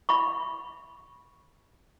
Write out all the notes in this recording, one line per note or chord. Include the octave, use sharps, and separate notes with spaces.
E5 B5 C#6